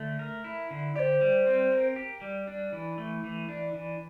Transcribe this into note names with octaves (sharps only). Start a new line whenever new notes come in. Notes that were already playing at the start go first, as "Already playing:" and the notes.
Already playing: D3 A3
A#4
E4
D3
G4 C5 D5
G3
C4
A#4
G4
G3
D4
E3
A3
E3
D4
E3